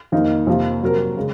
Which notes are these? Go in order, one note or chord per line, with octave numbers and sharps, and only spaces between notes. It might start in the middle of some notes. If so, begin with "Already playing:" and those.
F2 D#3 A#3 D#4
F2 C3 F3 A#3
C3 F#3 C4 F#4 A#4
C#3 G#3